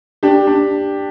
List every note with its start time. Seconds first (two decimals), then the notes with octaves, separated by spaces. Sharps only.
0.23 D4 G4
0.47 D4